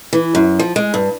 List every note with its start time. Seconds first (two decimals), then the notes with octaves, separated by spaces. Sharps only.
0.13 E3
0.35 F#2
0.59 F3
0.76 G#3
0.94 G2